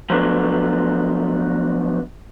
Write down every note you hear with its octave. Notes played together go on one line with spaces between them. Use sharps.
F3 F#3 A3 B3 D4